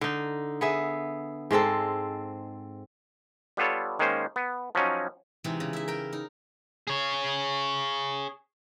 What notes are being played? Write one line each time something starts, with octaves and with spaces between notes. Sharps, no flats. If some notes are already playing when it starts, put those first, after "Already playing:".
D3 D#4
B3 G#4 E5
G#2 G#3 C4 A4
G3 B3 F4 A4 C#5
D#3 G#3 A#3 C#4 C5
B3
F3 F#3 C#4 D#4
C3 E3 G#3 D#4
C#3
E4 E5
A#4 G5
D#4
G#4 C#5